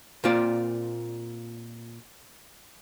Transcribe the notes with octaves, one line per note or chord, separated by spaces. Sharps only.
A#2 C4 F4 D5